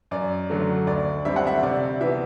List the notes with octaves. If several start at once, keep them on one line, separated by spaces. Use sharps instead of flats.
F#2 D5
D3 F#3 A3
D2 D5
D3 G3 C4 E5
F#5
E5
C3 D5
E3 B3 E5